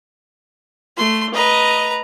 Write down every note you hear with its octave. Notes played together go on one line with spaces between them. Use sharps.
A3 C6
B4 D#5 A#5